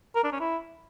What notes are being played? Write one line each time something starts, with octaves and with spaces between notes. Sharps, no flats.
A#4
D4
C#4
E4